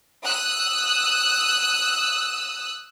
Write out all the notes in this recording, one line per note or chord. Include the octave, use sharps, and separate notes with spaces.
D#6 E6 F#6